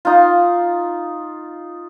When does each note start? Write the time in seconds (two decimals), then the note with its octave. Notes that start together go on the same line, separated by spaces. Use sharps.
0.05 D#4 F4